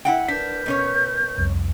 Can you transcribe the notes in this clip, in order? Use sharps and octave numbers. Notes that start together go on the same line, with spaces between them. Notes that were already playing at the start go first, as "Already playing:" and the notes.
E4 F#5 G5
D4 A#4 B4 G6 B6
B2 C#4 C#5
C2 F2